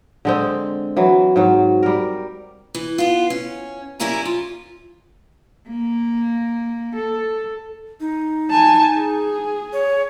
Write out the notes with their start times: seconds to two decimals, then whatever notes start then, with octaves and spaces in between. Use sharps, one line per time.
0.25 D3 G#3 C4
0.97 E3 F#3
1.36 G#2 F#3
1.83 G3 A#4
2.75 E3
2.98 B3 F4
3.30 C#4
4.00 F#2 G3 C#4 E4 A#4 G#5
4.25 F4
5.69 A#3
6.95 A4
8.00 D#4
8.50 G#5 A5
8.98 G#4
9.73 C#5